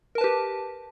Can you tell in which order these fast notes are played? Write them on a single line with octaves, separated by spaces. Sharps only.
A#4 A5 B4 G4